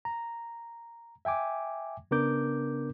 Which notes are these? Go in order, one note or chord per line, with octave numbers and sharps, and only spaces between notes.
A#5
E5 G5 G#5 D6
C#3 B3 D4 A#4 D6 G6